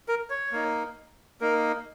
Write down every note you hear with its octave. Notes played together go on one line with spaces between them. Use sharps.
A#4
C#5
A#3 D#4
A#3 D#4 A#4